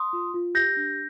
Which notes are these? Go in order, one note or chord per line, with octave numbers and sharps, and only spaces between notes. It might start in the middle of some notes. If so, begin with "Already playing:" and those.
Already playing: C6 D#6
F4
F4
G4 G6 A#6
D4